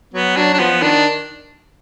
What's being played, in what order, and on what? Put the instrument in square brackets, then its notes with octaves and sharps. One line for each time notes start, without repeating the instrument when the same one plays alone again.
[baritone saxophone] F#3 [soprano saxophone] B3
[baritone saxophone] F#3 [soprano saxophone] D4
[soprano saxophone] D4
[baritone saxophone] F3 [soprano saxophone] B3
[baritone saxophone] D#3 [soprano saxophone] D4